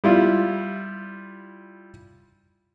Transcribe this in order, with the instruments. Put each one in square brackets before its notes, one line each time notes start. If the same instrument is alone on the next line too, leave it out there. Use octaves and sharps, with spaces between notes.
[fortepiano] G3 E4 F4